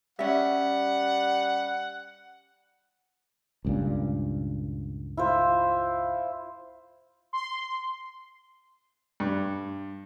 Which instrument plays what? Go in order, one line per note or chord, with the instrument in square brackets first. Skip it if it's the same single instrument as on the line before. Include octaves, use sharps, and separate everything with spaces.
[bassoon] G3 [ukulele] C#4 E5 [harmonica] F#5
[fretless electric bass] C#2 G2 A#2
[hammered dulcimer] E4 F4 C5
[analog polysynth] C6
[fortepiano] G2